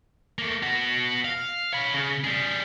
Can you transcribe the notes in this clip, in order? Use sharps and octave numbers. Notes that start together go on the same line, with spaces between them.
A3 A#3
B3 F#4
F5
C#5 B5
C#3
G3 G#4